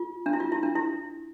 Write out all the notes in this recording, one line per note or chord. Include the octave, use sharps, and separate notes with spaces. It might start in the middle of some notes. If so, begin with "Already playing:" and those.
Already playing: F4
D4
E4
F4
E4
D4
E4